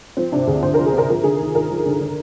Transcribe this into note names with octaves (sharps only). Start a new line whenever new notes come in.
F3 C4
C3 D4
D2 G#4
D2 C5
F3 A#4
G#4
C3
A#4
F3 A#4
D3 G#4
D#2
D#2 A#4
F3
D3
D3